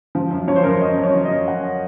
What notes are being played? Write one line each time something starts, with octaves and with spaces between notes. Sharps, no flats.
F3
F#2
F3 C#5
C5
F#2 A#4
C5
F#2 D#5
F#2
C#5
F3
D#5
F#2
F#2 F#5